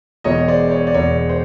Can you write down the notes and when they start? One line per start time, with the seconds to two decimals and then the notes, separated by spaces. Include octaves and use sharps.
0.24 E1 E2 B2 C#5 D#5
0.48 C5 D5
0.71 C#5
0.87 D5
0.94 E1 E2 B2 C#5
1.29 C5